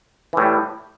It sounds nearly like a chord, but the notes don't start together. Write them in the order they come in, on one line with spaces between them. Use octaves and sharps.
E3 A2 G3